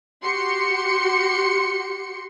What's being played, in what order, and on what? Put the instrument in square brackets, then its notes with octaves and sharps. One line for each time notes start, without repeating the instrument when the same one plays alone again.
[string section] F#4 G4 C6 C#7